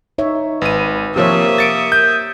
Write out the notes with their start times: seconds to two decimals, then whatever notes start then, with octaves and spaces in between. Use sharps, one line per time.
0.18 D#4 C#5 E5
0.61 G#1 B4 D#7
1.16 C3 F3 A#3 G4 C#5 E5 D#6
1.58 A6 C#7 D7
1.92 G6